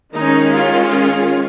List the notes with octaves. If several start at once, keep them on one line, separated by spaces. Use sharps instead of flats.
D#3 G#3 C#4 D#4
F4
F4 G#4